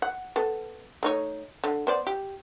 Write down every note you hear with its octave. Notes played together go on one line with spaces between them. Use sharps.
F#5
B3 A4
A3 D#4 C#5
D3
B3 C5 D5
G4